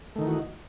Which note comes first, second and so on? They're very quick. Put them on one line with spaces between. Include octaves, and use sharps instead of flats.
A3 D#3 D#4 E3 F#4